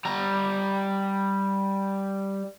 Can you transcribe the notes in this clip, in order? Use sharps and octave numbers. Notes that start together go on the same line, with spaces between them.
G3 A#5